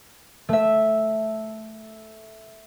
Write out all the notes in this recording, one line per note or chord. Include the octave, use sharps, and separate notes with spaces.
A3 E5